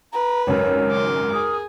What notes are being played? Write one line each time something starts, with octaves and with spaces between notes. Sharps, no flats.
B4 A#5
G#1 C#2 F#2 A#4 C#5
C6 D6
G#4 D#6